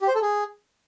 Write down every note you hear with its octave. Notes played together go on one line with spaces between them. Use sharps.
G4
C5
A4
G#4